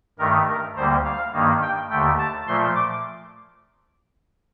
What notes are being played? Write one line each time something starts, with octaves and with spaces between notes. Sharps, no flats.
G2 D#3 A3 A#4
A#4
D2 D3 G3 A#3 C5
F5
G2 D#3 A#3
G5
D#2 D3 A3 G5
A5
A#2 F3 A3 C6
D6